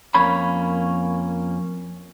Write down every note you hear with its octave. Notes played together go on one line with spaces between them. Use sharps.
F2 A#3 C#4 C#5 B5